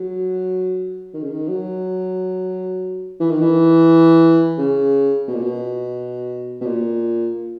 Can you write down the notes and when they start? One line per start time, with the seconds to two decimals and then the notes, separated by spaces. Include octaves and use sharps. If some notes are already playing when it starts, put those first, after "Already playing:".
Already playing: F#3
1.14 D#3
1.22 C#3
1.30 D#3
1.48 F#3
3.20 E3
3.31 D#3
3.41 E3
4.58 C#3
5.28 B2
5.34 A#2
5.42 B2
6.61 B2
6.66 A#2